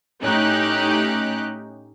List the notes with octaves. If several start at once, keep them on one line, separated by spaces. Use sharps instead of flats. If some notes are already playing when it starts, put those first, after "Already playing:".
A2 C#4 D#4 G4 F#6